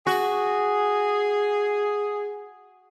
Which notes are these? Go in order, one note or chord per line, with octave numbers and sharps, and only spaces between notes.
F#4 G#4